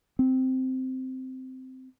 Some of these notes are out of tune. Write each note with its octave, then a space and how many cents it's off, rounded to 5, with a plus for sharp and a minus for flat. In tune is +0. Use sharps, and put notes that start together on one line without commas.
C4 -10